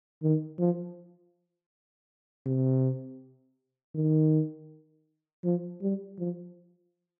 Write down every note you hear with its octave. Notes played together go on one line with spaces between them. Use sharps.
D#3
F3
C3
D#3
F3
G3
F3